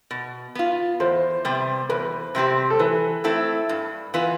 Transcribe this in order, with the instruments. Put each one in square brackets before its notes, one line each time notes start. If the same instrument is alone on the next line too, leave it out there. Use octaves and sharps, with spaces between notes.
[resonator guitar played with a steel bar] B2
B3 F4
[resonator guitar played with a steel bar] E2 [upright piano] C5
[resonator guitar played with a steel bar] C3 G3 B3
[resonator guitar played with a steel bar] E2 [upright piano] B4
[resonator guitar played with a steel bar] C3 G3 C4 G4
[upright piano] A4
[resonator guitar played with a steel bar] E3 [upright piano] B4
[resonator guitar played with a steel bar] A3 C4 E4 A4
G2
E3 B3 F4 B4